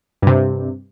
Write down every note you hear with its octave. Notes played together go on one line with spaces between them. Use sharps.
G2 C3